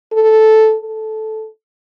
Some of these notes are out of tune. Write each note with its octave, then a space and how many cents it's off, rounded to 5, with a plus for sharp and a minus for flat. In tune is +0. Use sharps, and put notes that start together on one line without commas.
A4 -5
A4 -10